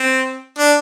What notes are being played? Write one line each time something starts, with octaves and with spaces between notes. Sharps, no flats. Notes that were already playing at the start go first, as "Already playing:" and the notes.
Already playing: C4
D4